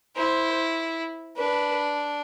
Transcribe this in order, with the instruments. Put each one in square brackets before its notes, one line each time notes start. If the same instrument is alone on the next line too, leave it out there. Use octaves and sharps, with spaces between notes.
[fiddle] E4 [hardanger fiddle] C5
[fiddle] D4 [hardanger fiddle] B4